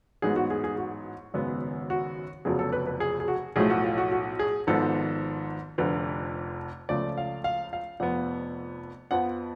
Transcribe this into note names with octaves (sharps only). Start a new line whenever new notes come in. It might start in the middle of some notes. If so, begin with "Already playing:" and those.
A1 G#2 F#3 B3 G#4
F#4
G#4
G#4
F#4
G#1 F#2 C#3 G#3 B3
F#4
F1 F2 C#3 F#3 B3 G#4
A4
B4
B4
G#4
G#4
F#4
B1 A2 F3 A3 G#4
F#4
F4
F#4
F#4
G#4
G#1 G#2 F3 B3 A4
F1 F2 D3 F3 B4
C#2 C#3 F3 A3 D5
F5
F5
F5
F1 F2 F3 B3 F#5
F2 F3 B3 F#5